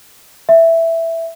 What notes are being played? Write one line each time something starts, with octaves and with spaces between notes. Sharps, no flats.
E5